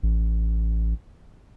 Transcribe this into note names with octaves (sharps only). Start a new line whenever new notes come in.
A1